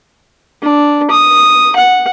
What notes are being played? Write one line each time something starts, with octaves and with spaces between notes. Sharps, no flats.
D4
D#6
F#5